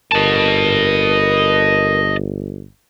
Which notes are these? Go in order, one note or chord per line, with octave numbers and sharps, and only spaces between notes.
G1 A#4 D#5 A5